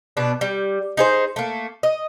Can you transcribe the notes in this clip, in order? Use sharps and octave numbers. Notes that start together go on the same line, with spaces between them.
B2 B3 D4
G3
D#4 G#4 C5
A3 A#3
D#5